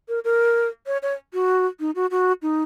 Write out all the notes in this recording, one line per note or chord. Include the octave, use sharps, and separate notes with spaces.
A#4
A#4
C#5
C#5
F#4
D#4
F#4
F#4
D#4